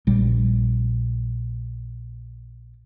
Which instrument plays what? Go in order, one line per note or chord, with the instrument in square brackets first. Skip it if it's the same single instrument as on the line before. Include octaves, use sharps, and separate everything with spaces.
[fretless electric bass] A#1 G3